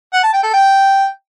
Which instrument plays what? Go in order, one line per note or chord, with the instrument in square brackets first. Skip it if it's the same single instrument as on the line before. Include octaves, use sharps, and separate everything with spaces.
[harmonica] F#5
A5
G5
A4
G5